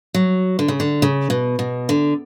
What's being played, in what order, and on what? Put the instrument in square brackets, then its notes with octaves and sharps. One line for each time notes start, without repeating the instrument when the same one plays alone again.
[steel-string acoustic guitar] F#3
D3
C#3
D3
C#3
B2
B2
D3